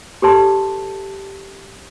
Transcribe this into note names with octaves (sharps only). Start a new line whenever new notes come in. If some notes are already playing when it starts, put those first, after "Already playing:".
G4 A4 B4 C#5 A5 C6